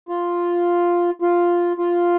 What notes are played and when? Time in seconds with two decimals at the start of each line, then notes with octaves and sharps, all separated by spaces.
0.09 F4
1.22 F4
1.78 F4